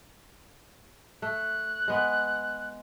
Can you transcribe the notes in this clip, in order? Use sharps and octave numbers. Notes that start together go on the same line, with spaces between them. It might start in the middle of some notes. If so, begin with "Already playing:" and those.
A3 F#6
G#3 B3